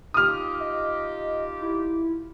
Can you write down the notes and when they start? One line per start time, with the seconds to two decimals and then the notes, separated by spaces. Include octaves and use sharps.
0.14 D#4 F4 G4 D#6 F6
0.60 D#5
1.61 E4